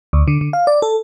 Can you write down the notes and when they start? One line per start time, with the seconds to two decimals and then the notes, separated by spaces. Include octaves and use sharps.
0.13 D2
0.28 D3
0.41 D3
0.53 F5
0.67 D5
0.82 A4